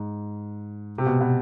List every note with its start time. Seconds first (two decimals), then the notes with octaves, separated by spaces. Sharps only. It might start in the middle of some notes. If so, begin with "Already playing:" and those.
Already playing: G#2
0.98 C3
1.06 B2
1.21 B2